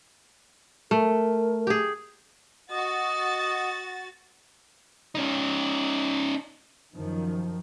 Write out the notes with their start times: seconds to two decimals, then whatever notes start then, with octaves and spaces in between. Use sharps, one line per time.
0.91 A3 A#4
1.67 G4 G#4
2.71 F#4 D#5 A6
5.15 C#4 D#4
6.95 F#2 D#3 F3